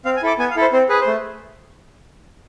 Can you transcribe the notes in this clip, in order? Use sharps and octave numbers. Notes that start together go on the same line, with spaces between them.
C4 F5
G#5
E4 A4 D6
B3 G#5
F5
E4 A4
C5
C4 C5
G#4 B4
C5
A3